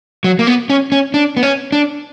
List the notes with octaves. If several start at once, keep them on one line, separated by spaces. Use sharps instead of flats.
F#3
A#3
B3
C#4
C#4
D4
B3
C#4
D4